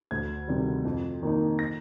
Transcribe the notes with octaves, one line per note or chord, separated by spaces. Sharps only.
D2 G#6
C3 D#3 G3
F2
D#3 A#3 D#4
A#6